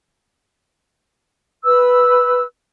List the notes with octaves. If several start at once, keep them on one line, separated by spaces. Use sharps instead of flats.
B4 E6